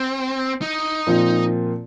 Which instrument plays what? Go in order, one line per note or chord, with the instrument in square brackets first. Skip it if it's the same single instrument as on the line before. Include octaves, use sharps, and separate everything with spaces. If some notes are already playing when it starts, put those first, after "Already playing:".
Already playing: [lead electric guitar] C4
D#4
[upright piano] A#2 F3 C4 F4